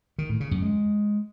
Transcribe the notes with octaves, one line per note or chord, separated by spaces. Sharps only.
D#3
A2
C#3
F#2
G#3